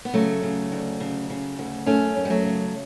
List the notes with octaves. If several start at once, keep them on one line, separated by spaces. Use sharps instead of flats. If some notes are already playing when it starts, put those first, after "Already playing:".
B3
C#3 F#3 A3
C#3
D2
C#3
C#3
D2
F#2 A3 C#4
F#2
G3
F#3 A3
C#3